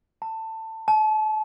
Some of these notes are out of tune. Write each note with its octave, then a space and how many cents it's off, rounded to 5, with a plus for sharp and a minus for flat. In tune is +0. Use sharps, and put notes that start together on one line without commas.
A5 +20
A5 -35